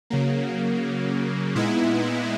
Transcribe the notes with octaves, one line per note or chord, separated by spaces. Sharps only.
C#3 F#3 A#3
A#2 G#3 B3 D#4 E4